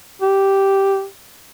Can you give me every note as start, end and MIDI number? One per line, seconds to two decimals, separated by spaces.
0.22 1.05 67